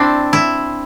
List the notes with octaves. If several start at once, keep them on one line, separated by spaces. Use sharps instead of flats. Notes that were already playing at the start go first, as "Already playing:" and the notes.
Already playing: C4 D4 E4
E4